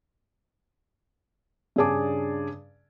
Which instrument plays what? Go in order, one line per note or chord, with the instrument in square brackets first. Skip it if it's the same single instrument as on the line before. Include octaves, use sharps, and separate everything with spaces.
[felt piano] G2 C#3 D4 G#4 A5 D6